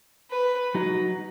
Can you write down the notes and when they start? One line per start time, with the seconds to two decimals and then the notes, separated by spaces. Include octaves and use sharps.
0.31 B4
0.75 F#3 D#4 F#4